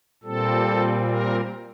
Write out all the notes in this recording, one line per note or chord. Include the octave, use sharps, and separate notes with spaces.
A#2 G3 C4 A4
A#4